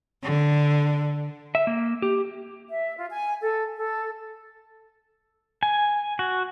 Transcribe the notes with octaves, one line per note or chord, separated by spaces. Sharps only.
D3
E5
A#3
G4
E5
F4
G#5
A4
A4
G#5
F#4